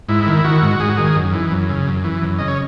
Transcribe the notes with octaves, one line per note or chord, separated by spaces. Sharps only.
G#2 E4
D#3
D#3 F#4
G#2
G#2 G#4
F#4
D#3 G#4
F#2
E3
F#2
C#3
F#2
E3
F#2
C#3 D#5
C#5